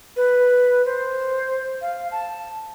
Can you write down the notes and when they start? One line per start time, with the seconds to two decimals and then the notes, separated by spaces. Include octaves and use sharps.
0.16 B4
0.86 C5
1.82 F5
2.11 A5